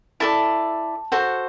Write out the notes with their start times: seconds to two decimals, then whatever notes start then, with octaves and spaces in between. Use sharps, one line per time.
0.20 E4 A4 D5 A5
1.12 F#4 A4 C5